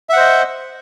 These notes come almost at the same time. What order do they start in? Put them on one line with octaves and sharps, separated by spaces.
E5 F#5 C5 D#5